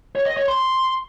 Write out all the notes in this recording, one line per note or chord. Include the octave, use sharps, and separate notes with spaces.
C#5
D#5
C#5
C6